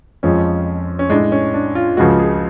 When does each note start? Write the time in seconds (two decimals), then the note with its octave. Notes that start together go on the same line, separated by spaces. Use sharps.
0.23 F2 F3 G#3 C#4
0.99 C#4
1.10 A2 G#3 D4
1.32 C#4
1.54 D4
1.75 F4
1.97 C#2 C#3 F3 G#3 F#4
2.19 G#4